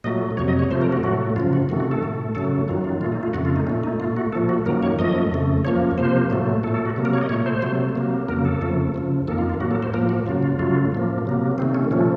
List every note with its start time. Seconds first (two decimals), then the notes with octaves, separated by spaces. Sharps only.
0.04 A#2 F#3 A3 D#5
0.37 F2 C3 F#3 C#5
0.48 D#5
0.59 C#5
0.71 C3 F3 A3 C5
0.82 A#4
0.92 F#4
1.03 A2 F#3 A3 F#4
1.36 F#2 C#3 F3 F4
1.53 F#4
1.69 C3 D#3 A3 F#4
1.80 F#4
1.91 A4
2.02 A2 A3
2.35 F#2 C#3 F#3 A3 A4
2.68 F#2 D#3 F#3 F4
2.84 F4
3.01 A#2 A3 F4
3.12 D#4
3.23 F4
3.33 F2 C#3 A3 F#4
3.45 F4
3.56 D#4
3.67 A#2 A3 C#4
3.84 D#4
4.00 A#2 A3 F4
4.17 F#4
4.32 A#2 F3 A3 A4
4.49 F#4
4.65 F#2 D#3 F#3 A#3 A#4
4.83 C#5
4.99 F#2 F3 A3 D#5
5.31 F2 C#3 A3
5.65 F#2 F3 A#3 C#5
5.98 C3 F3 A#3 C5
6.30 A2 F#3 A3
6.63 A#2 A4
6.67 A3
6.74 A4
6.85 F#4
6.96 C3 F#3 A#3
7.05 A#4
7.13 C#5
7.21 D#5
7.29 A#2 A3 C#5
7.46 C5
7.62 C3 F#3 A3
7.95 C3 F#3 A#3
8.28 F2 C#3 F#3 A#3 A#4
8.45 A4
8.61 F2 C#3 F3 A3
8.94 F#2 C#3 F3
9.28 F2 D#3 A#3 A4
9.38 F4
9.50 F4
9.60 A2 F#3 A#3 F#4
9.71 A4
9.83 C5
9.94 A2 F3 A#3 A#4
10.09 F#4
10.26 F#2 C#3 F#3 F4
10.42 F4
10.59 F#2 C#3 F#3 A3 F4
10.92 A2 F3 A#3
11.25 C3 F#3 A#3
11.58 C3 D#3 A3 C4
11.75 C#4
11.91 A#2 F3 A3 C#4